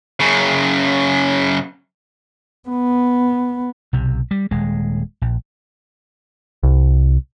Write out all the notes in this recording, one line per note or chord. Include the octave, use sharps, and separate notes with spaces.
F#2 C#3
B3
B1 C3
G3
D#1 G#3
A#1
C2